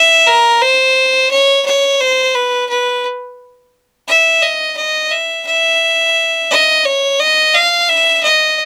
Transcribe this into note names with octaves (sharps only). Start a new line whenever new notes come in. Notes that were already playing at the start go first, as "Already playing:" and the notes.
Already playing: E5
A#4
C5
C#5
C#5
C5
B4
B4
E5
D#5
D#5
E5
E5
D#5
C#5
D#5
F5
E5
D#5